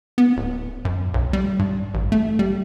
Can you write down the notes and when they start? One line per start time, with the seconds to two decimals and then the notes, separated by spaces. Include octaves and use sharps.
0.18 B3
0.36 D1
0.85 F#2
1.14 B1
1.33 G3
1.59 G2
1.94 A1
2.12 A3
2.39 G3